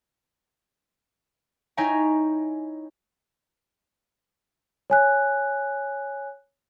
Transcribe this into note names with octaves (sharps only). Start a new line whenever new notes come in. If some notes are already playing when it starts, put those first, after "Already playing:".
D#4 E4 C#5 G5 G#5 A#5
C#5 G#5 F#6